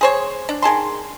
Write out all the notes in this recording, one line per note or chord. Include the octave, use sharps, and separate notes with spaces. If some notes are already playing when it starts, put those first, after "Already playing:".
G#4 C5 C#5
D4
D#3 G#4 A5 C6